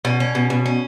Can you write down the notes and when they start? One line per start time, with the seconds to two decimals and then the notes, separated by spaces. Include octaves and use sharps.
0.05 B2 C#4
0.20 C#4
0.35 B2
0.50 B2
0.66 C#4